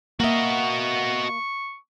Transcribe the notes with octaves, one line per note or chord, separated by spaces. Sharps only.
A#3 F#4 D#5 E5 C#6